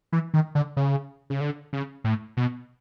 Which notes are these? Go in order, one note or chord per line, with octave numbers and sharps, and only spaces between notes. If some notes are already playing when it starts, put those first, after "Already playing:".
E3
D#3
D3
C#3
C#3
D3
C#3
A2
B2